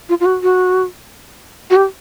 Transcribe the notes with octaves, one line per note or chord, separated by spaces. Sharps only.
F4
F4
F#4
F#4
F#4
G4